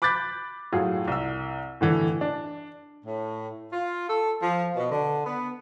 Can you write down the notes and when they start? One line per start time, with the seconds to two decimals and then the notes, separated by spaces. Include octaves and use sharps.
0.02 B5 D6 F#6 G6 A6 B6
0.73 A2 F#3 F4 G#4
1.08 C2 E6
1.81 A2 D3 E3
2.21 D4
3.05 A2
3.72 F4
4.08 A4
4.42 F3
4.76 B2
4.90 D3
5.26 B3